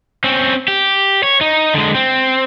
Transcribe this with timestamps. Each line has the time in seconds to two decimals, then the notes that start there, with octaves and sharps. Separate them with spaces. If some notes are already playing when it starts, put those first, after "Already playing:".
0.24 C4 C#4
0.68 G4
1.23 C#5
1.41 D#4
1.74 D3 G#3
1.95 C4